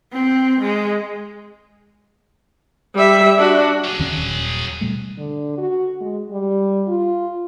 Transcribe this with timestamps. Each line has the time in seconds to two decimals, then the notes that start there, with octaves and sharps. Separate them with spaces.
0.13 C4
0.61 G#3
2.94 G3 E5
3.38 D4 F#4
3.85 F#3 G#4
3.99 D#2 D#3 C#4
4.16 D#1
4.81 B2 G3 A3
5.18 D3
5.58 F#4
6.01 G#3
6.30 G3
6.88 F4